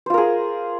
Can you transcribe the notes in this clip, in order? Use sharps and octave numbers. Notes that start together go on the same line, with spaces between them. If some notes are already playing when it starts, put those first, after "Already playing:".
F4 G#4 A#4 C5